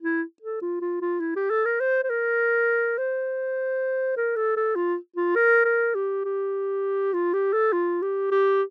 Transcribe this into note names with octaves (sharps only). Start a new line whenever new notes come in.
E4
A4
F4
F4
F4
E4
G4
A4
A#4
C5
C5
A#4
C5
A#4
A4
A4
F4
F4
A#4
A#4
G4
G4
F4
G4
A4
F4
G4
G4